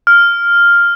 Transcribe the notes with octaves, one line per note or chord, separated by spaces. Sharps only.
F6